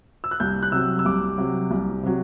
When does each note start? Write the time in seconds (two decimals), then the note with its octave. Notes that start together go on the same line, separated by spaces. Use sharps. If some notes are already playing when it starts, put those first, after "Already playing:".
0.24 E6
0.31 F#6
0.40 C2 G6
0.63 F#6
0.72 C3 F#3 E6
0.99 E6
1.05 C2 D6
1.38 C3 F#3
1.71 C2
2.03 C3 F#3